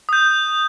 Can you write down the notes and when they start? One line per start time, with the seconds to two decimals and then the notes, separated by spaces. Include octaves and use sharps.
0.09 D#6 G6